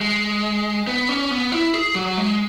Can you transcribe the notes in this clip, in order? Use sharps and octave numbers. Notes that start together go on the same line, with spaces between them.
G#3
B3
C#4
B3
E4
G#4
F#3
G#3